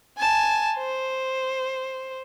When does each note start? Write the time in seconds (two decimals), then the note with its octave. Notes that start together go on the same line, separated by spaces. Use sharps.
0.17 G#5 A5
0.77 C5